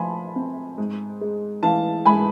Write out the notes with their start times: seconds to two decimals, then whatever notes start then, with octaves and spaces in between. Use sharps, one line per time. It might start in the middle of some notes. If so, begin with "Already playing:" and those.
Already playing: F3 G#5 A5 B5 C6
0.36 C4
0.78 G#2
1.21 G#3
1.63 E3 F5 A5
2.05 G#2 G#5 B5